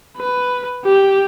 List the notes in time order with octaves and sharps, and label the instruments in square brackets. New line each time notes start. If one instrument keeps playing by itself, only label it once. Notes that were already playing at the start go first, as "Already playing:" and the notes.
[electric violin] B4
G4